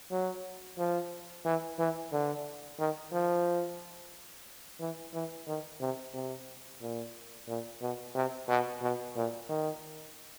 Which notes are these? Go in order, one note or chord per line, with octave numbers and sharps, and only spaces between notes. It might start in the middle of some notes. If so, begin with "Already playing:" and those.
F#3
F3
E3
E3
D3
D#3
F3
E3
E3
D#3
C3
C3
A#2
A#2
B2
C3
B2
B2
A#2
D#3